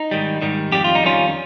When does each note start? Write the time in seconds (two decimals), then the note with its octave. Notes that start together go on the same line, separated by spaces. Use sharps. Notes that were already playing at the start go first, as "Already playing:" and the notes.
Already playing: D#4
0.11 G#2 D#3 G3
0.42 G#2 D#3 G3
0.72 F2 D#3 G3 G4
0.84 F4
0.95 D#4
1.03 F2 D#3 G3 C#4 F4